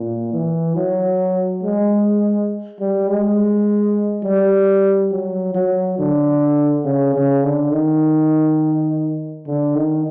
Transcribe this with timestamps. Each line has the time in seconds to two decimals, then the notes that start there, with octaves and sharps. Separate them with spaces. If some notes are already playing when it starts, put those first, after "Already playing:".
Already playing: A#2
0.32 E3
0.76 F#3
1.63 G#3
2.79 G3
3.08 G#3
4.24 G3
5.11 F#3
5.54 F#3
5.98 D3
6.85 C#3
7.14 C#3
7.43 D3
7.71 D#3
9.46 D3
9.75 D#3